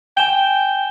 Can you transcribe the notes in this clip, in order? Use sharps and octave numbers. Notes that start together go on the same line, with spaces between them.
G5 G#5 E7 G7